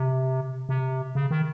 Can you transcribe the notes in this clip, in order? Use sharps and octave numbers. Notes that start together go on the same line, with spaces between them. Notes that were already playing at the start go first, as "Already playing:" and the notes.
Already playing: C3
C3
C#3
D#3